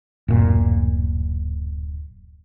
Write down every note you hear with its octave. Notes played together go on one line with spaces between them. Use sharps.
D1 F#2 A#2